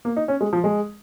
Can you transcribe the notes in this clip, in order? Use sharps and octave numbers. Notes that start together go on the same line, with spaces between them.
A#3
D#4
C#4
G#3
F3
G#3